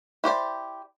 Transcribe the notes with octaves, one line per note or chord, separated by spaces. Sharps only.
E4 G4 C5 D5